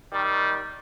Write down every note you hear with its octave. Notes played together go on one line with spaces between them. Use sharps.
D#3 G3